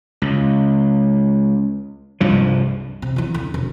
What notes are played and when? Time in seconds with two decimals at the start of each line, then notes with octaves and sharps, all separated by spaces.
0.22 C#2
2.21 C2 G2 F3
3.02 C3
3.16 E2 E3
3.34 D3
3.54 E1